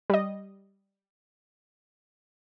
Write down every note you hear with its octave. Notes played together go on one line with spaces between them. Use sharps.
G3 D#5